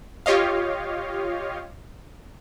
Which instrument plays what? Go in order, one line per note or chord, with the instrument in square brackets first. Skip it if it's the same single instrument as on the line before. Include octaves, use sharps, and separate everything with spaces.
[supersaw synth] F4 G4 C#5 D#5 F5